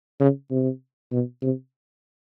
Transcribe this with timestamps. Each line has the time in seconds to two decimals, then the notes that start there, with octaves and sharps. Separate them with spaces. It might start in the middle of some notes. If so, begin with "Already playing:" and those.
0.20 C#3
0.51 C3
1.12 B2
1.42 C3